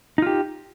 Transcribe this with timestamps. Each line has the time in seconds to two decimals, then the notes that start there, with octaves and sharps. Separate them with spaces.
0.18 D#4
0.22 F4
0.27 G4